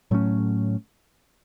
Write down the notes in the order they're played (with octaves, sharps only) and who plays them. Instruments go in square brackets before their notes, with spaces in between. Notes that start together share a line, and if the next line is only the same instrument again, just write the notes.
[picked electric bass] A2 F#3 A3 C#4